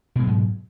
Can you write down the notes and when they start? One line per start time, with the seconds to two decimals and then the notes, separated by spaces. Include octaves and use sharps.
0.16 B2
0.19 G#3
0.23 F#3
0.27 G#2